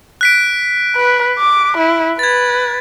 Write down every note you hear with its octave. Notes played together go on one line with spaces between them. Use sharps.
F#6 B6 D7
B4
D6
E4
B4 G#6 A6